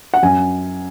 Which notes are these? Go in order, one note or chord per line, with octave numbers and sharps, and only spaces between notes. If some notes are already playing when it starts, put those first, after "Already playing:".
F#5
F#2 G#5